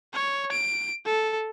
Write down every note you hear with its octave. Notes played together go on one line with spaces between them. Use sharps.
C#5
D7
A4